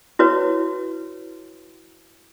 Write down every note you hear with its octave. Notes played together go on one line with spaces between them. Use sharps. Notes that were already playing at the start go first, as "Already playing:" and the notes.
E4 F#4 B4 C#5